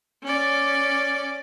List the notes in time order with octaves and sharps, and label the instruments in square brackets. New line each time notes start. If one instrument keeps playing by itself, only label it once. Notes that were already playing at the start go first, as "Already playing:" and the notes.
[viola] C#4 D5